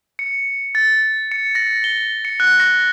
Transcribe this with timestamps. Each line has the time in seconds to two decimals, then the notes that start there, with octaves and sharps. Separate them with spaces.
0.19 C#7
0.75 A6
1.32 C#7
1.55 A#6
1.84 G7
2.25 C#7
2.40 F#6
2.60 A#6